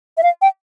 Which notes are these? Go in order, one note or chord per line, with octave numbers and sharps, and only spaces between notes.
E5
F5
G5